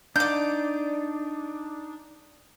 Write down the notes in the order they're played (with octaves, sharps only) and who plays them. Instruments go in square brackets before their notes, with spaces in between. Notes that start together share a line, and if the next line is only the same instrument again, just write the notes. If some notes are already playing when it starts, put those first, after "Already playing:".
[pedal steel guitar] D4 D#4 [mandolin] D5 G6